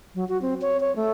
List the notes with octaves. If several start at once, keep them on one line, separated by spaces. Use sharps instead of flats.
F#3
F#4
C4
C#5
C#5
A3